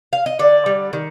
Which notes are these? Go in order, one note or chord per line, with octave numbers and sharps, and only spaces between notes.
F5
D#5
D3 D5
G3
D#3